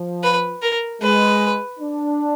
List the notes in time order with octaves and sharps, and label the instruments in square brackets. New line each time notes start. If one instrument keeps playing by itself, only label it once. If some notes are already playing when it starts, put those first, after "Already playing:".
Already playing: [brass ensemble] F3
[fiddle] B4
A#4
[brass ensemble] G#3 [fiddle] B4
[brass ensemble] D4